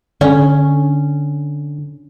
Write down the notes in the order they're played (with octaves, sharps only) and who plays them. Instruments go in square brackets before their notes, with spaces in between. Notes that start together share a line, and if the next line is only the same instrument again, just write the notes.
[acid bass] D3 [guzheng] C#4